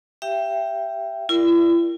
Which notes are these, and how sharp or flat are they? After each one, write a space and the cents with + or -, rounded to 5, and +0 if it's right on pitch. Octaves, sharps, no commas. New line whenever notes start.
G4 +0 E5 +30 G5 +0
E4 +40 A#4 +0 D5 +0